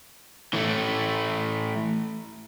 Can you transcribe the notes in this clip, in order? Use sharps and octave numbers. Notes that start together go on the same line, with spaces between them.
E3 A3